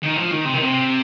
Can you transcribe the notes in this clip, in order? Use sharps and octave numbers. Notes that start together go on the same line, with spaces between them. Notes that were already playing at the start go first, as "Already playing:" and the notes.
D#3
F3
D#3
C3
D#3
C3